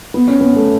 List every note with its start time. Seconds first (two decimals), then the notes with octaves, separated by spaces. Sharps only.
0.14 B3
0.28 C#4
0.41 B3
0.56 A3